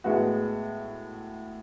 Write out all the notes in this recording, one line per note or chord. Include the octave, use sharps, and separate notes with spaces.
A2 G#3 B3 F#4